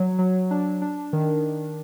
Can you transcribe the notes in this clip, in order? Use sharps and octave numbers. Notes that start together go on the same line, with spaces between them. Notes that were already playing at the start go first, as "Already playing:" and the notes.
Already playing: F#3
F#3
D4
D4
D#3